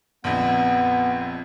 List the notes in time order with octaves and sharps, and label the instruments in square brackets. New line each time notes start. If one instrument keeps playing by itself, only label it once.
[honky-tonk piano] A#1 F2 [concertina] B3